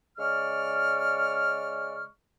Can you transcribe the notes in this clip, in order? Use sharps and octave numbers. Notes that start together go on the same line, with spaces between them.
C#3 G#3 D5 C#6 F6